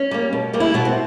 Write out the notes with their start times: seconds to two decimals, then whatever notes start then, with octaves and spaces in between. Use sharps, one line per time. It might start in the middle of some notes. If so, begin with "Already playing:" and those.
Already playing: C#4
0.11 G3 A#3
0.33 B2
0.53 G3 A#3
0.60 E4
0.74 B2 B3
0.85 C4